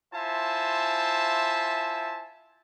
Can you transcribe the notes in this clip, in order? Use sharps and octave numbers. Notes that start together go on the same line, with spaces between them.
E4 F4 C5 E5 G#5 A5